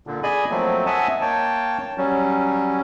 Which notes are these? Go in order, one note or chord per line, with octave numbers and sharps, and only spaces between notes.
A#2 D3
G#4 D5 D#5 G#5 B5
F3 F#3 A3 A#3 C4
D#5 E5 F#5 G#5 A5
A#3 C#5 G5 A5
F#3 G3 C#4